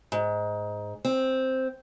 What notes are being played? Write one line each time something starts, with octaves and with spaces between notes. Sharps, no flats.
G#2
C4